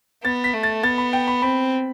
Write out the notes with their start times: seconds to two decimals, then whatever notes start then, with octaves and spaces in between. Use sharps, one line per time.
0.24 B3 A6
0.44 B6
0.54 A3
0.63 A6
0.83 B3 A6
0.98 B5
1.13 G5
1.28 B5
1.42 C4 B5